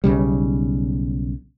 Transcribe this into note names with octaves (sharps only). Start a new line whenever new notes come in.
B1 C#3 G3